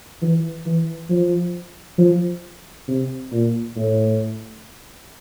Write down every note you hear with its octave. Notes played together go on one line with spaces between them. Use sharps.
E3
E3
F3
F3
C3
A#2
A2